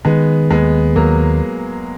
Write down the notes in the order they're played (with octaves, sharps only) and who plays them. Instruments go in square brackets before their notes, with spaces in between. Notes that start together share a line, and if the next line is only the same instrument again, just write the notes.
[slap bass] D#3 [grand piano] G#3 B3
[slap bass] D#2 [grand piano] G#3 B3
[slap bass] D#2 [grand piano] F#3 A#3